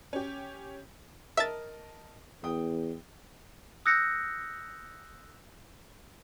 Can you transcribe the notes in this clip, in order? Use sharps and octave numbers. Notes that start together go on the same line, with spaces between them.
C#4 G4
A#4 D#5 E5 A5 A6
E2 G5 D#6
D#6 E6 F#6 G6 A#6 C#7